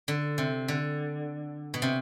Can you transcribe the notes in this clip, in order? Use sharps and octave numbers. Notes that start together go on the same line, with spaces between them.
D3
C3
D3
B2
C3